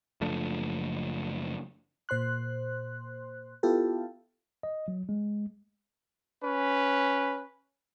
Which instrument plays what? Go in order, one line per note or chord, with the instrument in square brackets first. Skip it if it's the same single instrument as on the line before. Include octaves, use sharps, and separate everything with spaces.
[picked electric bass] F#1 F3 A3 D4
[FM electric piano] A#2 C5 C6 F#6
B3 E4 F4 G4 A4
[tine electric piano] D#5
F#3
G#3
[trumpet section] C#4 B4